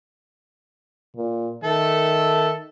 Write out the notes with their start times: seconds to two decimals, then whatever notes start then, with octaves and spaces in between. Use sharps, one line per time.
1.16 A#2
1.64 D#3 A4 E5